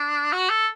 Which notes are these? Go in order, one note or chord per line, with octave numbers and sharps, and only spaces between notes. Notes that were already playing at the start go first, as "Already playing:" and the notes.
Already playing: D4
F#4
A4